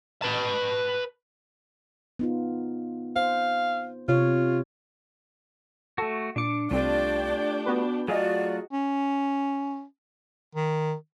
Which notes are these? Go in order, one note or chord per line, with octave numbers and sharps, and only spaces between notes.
B4 A5
B3 D#4 F4
C5 F5
C3 F4 C#5
A3 F#4 A4
A#2 D4 D6 C#7
C2 A3 C4 D4 F4 G4 D5 G5
B3 F#4 B4
F#3 A3 F4 F#4 G#4 D5 D#5
C#4
D#3